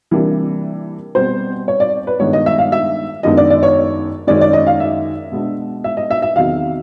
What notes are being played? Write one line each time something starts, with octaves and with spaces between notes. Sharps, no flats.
C3 E3 G3 A#3 D4
B2 G3 C4 C5
C#5
D5
B4
G2 D#3 G#3 B3 C#5
D#5
E5
F5
E5
F#2 D#3 G#3 B3 D4 D#5
D5
D5
C#5
F#2 D#3 G#3 C#4 D5
D5
D#5
F5
E5
B2 G#3 B3 D4
E5
D#5
E5
E5
E2 C3 D#3 F#3 F5